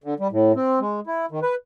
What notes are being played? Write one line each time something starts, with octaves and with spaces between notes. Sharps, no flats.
D3
G3
A2
C4
G#3
E4
D#3
B4